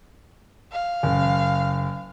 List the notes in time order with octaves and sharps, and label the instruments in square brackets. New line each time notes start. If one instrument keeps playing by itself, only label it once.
[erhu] F5
[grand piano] F#1